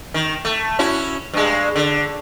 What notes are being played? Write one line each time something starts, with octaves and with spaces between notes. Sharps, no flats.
D#3
A3
C#4 E4 F#4
G2 G#3
D3